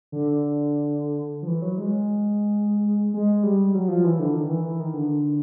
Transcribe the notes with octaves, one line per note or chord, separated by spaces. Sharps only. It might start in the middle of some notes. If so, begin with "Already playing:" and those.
D3
F3
E3
F#3
G#3
G#3
G3
F#3
F3
E3
D3
D#3
E3
E3
D#3
D3